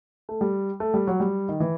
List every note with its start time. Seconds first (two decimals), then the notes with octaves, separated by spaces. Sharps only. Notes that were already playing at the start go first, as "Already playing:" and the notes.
0.29 A3
0.41 G3
0.80 A3
0.94 G3
1.07 F#3
1.20 G3
1.49 D#3
1.60 E3